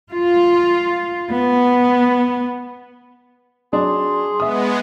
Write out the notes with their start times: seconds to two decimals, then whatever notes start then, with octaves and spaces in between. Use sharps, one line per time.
0.11 F4
1.32 B3
3.73 F#3 D4 G#4 C6
4.40 G#3 B3 E5 D#6